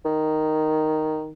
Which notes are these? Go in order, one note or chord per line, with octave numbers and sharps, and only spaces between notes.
D#3